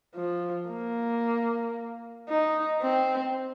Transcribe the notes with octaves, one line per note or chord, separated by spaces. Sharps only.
F3
A#3
D#4
C4